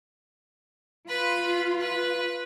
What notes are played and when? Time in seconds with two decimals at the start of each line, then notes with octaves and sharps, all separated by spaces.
1.08 F4 B4 B5
1.80 B4